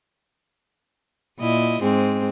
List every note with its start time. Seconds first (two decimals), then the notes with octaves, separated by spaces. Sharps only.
1.39 A#2 E4 D#5
1.81 G#2 G#3 C4